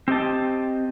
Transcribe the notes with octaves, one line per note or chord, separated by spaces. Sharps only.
C4 G4 D#5 A5